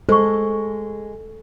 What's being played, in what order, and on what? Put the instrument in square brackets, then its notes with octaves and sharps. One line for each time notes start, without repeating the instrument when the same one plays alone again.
[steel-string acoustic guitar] G#3 [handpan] A4 [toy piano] C5 C#6